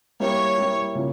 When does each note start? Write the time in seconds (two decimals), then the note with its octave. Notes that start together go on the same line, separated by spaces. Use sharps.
0.20 G3 A#3 E4 C#5
0.57 G3 A#3 E4
0.95 C#3 F3 A#3 C#4